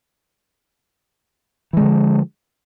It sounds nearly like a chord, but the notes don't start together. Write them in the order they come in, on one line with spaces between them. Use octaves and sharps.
E3 G#3 D3 F3